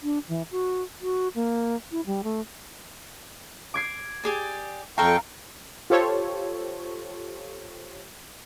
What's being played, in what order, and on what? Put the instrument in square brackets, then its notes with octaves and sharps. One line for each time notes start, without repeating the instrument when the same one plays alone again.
[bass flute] D4
E3
F#4
F#4
A#3
E4
G3
A3
[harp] D6 G#6 C7
[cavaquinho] G4 G#4 D5
[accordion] F2 G5 C#6 [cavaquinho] A4 F5 [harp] A#5
[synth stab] F4 G4 A4 C5 C#5